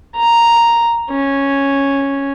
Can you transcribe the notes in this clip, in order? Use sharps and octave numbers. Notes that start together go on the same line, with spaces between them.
A#5
C#4